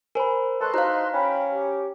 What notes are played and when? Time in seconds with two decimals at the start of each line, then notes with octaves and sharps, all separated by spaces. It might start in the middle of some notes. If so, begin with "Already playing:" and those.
0.15 A#4 C5 G#5 B5
0.61 A4 B4 D#5 A5 C6 C#6 F#6
0.74 D#4 E4 F#4 C5 F5 A#5
1.13 C#4 G5 B5
1.53 G4